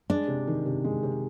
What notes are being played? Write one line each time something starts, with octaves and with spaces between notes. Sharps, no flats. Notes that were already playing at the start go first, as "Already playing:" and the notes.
G#3 D4
C3
D#3
C3
G#3
C3